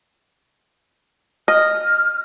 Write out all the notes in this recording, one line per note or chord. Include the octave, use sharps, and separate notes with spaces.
D#5 F6